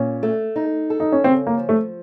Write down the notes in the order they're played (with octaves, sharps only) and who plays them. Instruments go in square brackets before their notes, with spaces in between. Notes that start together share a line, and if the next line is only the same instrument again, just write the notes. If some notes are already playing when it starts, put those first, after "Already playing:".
Already playing: [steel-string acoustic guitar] A#2 [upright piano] C#4
[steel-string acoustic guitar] A3
D#4
A4
[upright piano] D#4
C#4
[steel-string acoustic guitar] C#3 [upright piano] C4
[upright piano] A#3
[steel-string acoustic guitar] F3
[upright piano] A3